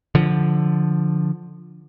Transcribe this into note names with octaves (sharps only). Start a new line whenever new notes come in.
D3 F3